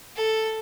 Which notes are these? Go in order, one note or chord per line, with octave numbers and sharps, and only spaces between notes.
A4